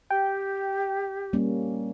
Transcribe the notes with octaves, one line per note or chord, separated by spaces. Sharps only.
G4 G5
G3 A#3 C#4